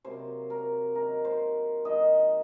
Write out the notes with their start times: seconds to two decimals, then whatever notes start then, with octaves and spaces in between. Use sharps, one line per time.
0.04 C3 F#3 A#3 C5
0.50 A#4
0.95 D#3 F#3 A#3 A#4
1.25 C5
1.85 D#3 A#3 D#5